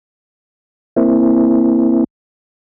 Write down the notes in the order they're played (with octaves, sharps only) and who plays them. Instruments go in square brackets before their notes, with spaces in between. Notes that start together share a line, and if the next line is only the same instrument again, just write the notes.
[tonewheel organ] A#3 C4 E4